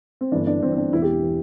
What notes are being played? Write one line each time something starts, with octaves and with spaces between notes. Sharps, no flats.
C4
G1 G2 E3 D4
D4
G1 G2 E3 C4
C4
D4
E1 E2 E3 E4
G4
E3